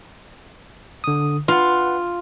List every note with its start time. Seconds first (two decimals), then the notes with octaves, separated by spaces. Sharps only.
1.04 D3 D#6
1.48 F4 B4 F#5